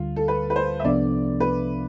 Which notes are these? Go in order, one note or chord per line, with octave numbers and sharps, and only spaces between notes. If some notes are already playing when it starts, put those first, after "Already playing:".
Already playing: D2 D3 G3 F4
A4
B4
B4
C5
E5
C2 C3 F3 B3 D4 D5
B4